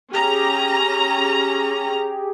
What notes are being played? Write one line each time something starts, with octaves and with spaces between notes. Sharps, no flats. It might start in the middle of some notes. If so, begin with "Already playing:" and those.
C#4 G4 G#4 A#5